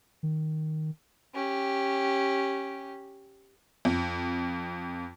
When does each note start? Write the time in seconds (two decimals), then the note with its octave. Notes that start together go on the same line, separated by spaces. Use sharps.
0.23 D#3
1.35 C#4 G4
3.85 F2